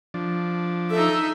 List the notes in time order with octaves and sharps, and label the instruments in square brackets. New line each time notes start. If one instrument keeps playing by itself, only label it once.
[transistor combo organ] F3 D4
[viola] D#4 E5 [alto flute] A4